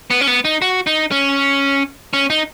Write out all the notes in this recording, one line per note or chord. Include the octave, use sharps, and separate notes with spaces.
B3
C#4
B3
D#4
F#4
D#4
C#4
C#4
D#4